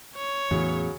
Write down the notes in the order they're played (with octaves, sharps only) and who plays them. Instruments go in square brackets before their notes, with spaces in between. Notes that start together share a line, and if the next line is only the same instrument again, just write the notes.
[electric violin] C#5
[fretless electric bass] E2 A2 [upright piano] C#3 F#3